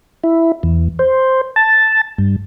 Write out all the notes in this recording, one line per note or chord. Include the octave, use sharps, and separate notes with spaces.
E4
E2
C5
A5
G2